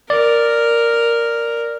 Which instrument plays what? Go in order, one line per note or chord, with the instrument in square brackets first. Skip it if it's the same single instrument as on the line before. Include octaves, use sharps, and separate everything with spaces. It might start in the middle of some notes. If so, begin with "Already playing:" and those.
[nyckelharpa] A#4 [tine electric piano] D5